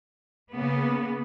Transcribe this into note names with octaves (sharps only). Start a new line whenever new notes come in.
C#3 A#3 B3